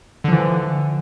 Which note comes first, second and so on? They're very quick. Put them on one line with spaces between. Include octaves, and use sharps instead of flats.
D3 F3 E3